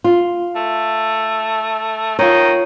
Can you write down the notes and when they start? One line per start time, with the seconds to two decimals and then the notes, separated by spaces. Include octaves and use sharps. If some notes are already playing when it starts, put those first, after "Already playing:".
0.04 F4
0.55 A3
2.19 D#3 F4 C#5